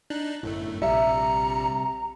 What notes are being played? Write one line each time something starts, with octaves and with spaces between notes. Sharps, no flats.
D4 D#4 F#6
G1 F#2 A2 A3
A#1 C3 G3 E5 A#5 C#7